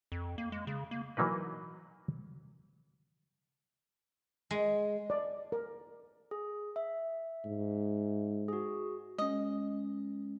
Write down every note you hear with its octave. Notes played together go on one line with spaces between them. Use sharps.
F2
A#3
G#3
C#3
A#3
E3 F#3 A#3 D#4 B4
G#3
D5
A#4
G#4
E5
G#2
F#4 G#4
G#3 C#4 D#5